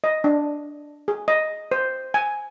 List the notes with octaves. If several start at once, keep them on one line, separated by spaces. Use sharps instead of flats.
D#5
D4
G#4
D#5
C5
G#5